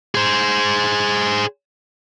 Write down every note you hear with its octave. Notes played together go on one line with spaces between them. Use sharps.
G#4 C5